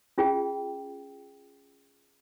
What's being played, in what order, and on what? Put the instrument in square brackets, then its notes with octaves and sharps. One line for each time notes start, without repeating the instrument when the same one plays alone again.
[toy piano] C#4 F4 G#4 G5